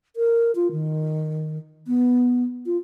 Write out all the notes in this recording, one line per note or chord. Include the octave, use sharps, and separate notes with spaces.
A#4
F4
D#3
B3
F4